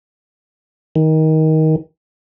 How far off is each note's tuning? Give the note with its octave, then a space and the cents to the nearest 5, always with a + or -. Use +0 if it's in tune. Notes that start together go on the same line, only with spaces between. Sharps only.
D#3 +20